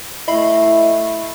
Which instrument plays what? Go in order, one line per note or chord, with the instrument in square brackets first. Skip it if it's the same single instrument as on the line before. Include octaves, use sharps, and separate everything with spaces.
[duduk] A3 [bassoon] E4 [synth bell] D#5 B5 C7